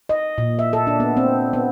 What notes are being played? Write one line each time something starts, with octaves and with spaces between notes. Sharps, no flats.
D#5
A#2
E5
A4
D4
B3
C4
B3